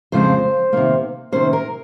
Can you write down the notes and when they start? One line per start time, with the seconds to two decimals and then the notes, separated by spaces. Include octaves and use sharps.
0.12 F2 C#3 F3 G#3 C4 C5
0.73 C3 D#3 A#3
1.32 C3 D#3 A#3 C#4 C5
1.53 A#4